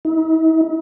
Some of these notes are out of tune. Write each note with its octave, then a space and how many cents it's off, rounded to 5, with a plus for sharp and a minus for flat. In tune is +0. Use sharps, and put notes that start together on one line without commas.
E4 -45